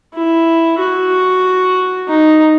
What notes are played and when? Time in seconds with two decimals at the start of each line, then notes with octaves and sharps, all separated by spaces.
0.14 E4
0.79 F#4
2.08 D#4